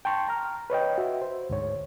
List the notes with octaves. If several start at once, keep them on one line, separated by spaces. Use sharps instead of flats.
G5 A5 C6 C#6
A#5 F6
B4 C#5 D#5 G5
F#4 E5
C5
D2 G#2 C#5